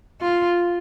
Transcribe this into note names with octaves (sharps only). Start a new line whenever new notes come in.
F4